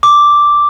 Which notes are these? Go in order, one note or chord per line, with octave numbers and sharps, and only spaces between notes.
D6